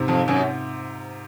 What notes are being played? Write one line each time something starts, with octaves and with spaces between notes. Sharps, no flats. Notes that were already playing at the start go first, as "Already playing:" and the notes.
Already playing: G#2 C3
F2
F#2